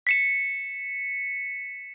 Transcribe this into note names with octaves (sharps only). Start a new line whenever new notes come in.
B6 C#7 E7